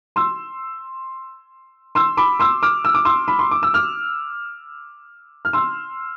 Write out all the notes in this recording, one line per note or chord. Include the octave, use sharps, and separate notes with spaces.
C6 E6
C6 E6
B5 D6
C6 E6
D6 F6
E6
D6
C6 E6
B5
C6
D6
E6
D6 F6
F6
C6 E6